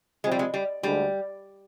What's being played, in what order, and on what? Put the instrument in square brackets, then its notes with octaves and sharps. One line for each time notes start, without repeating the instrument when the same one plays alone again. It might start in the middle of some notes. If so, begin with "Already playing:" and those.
[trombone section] C3 F3 C4 [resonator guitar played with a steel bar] G#3
[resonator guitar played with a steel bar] G3
G#3
G3
[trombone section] D2 D3 G#3 [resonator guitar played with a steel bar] G3